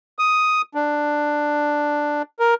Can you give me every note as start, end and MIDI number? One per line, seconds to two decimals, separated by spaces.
0.19 0.62 87
0.75 2.22 62
2.40 2.54 70